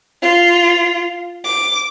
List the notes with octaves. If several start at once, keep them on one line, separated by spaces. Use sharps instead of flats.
F4
D6